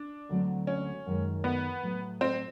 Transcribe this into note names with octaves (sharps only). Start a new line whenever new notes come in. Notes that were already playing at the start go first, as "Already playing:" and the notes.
Already playing: D4
D2 D3 F#3 A3 C4
C#4
F#2 D#3 G#3
B3
A2 F#3 A3
C4